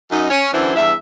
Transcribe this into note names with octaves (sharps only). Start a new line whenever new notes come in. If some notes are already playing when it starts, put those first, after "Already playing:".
F#2 D#4
C#4
F#2 D3 E3 E4 C5
E2 G2 E5